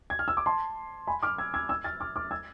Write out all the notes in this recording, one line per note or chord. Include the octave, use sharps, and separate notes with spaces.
G#6
F6
E6
D6
A5 C6
G#5 B5
D6 F6
E6 G#6
E6 G#6
E6 G#6
F6 A6
D6 F6
D6 F6
E6 G#6